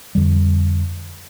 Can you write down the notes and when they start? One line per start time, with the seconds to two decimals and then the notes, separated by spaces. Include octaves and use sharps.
0.15 F2 D3 G3